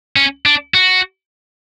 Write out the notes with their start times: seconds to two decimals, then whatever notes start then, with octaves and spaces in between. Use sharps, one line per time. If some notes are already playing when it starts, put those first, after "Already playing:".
0.16 C#4
0.46 D4
0.74 F#4